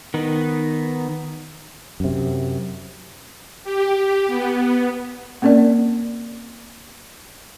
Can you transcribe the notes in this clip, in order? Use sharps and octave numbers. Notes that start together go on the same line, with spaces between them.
D#3 B3 D#4
F#2 C3
G4
B3
A#3 C4 C#4 A#4 D5